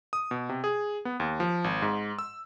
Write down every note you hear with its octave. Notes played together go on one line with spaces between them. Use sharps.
D#6
B2
C3
G#4
B3
D#2
F3
G#1
G#2
E6